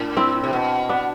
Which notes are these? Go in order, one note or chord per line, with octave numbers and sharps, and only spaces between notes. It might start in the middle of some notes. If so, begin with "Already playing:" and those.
Already playing: A2 D4
C4 E4
C3
B2
B3 D4